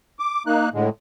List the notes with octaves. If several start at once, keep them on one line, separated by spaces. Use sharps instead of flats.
D6
A#3 D#4 F#6
A2 D3 G#3